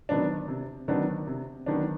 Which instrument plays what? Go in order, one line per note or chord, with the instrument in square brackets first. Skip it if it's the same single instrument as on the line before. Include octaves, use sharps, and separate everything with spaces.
[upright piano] D#3 F#3 B3 D4
C3
D#3 F#3 B3 D4
C3
D#3 F#3 B3 D4